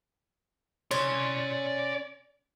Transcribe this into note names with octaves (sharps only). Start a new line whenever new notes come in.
C#4 D5 C6